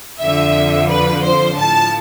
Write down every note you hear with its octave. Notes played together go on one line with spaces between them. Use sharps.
F2 D3 F3 E5
B4
C5
A2 F3 A5